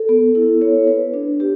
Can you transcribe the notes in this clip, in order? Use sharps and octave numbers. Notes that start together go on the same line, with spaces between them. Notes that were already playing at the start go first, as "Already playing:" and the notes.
Already playing: A4
B3
E4
C#5
B4
D4
G4